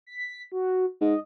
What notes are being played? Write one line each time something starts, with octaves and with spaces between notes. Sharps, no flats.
B6
F#4
G#2 D#5